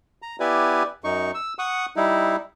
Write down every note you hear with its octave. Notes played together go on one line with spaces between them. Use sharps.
A#5
B3 E4 G4 B4 D5 G#5
F#2 D#4 C#6
E6
F#5 C#6 D#6
G3 D#4 E4